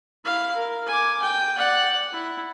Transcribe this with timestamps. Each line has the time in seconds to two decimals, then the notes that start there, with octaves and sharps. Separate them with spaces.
0.25 E4 F5
0.55 A#4
0.87 G#5 D6
1.22 G5
1.56 D5 F#5
2.12 E4